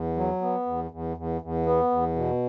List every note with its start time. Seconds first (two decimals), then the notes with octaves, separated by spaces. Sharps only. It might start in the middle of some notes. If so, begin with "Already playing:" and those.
Already playing: E2
0.17 F#3
0.41 B3
0.66 E2
0.91 E2
1.17 E2
1.41 E2
1.66 B3
1.91 E2
2.16 B2